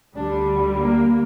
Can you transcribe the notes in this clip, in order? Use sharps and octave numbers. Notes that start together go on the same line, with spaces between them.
D2 D3 G3 D4
A#3